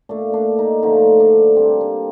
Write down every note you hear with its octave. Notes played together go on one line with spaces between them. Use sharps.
A#2 A3 D4
D4
D#4
D3 F3 A3 D#4
D4
C3 G3 A#3 C4
D4